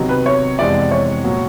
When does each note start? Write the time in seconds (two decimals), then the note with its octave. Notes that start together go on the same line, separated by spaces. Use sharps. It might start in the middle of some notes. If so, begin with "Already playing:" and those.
Already playing: C3 D#3 F#3 B3
0.09 B4
0.26 C#5
0.59 F2 C3 E3 G#3 B3 D5
0.91 C#5
1.24 A#2 F#3 B3